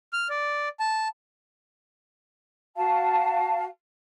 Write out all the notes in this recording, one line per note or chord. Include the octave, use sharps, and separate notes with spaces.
F6
D5
A5
F#4 F5 A5